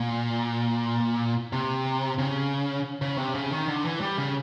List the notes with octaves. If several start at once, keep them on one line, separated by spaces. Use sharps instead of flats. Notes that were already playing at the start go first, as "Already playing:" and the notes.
Already playing: A#2
C3
C#3
C#3
C3
C#3
D#3
D3
E3
G3
C#3